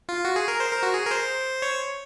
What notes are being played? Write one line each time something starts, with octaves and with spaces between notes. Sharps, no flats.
F4
F#4
G#4
A#4
C5
A#4
F#4
G#4
A#4
C5
C#5